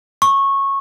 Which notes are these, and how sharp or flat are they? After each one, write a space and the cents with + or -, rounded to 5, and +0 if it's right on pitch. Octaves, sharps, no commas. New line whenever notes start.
C#6 -15